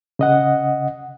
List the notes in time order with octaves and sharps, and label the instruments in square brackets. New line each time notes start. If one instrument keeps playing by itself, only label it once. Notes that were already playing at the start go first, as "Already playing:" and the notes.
[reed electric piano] C#3 D#5 F#5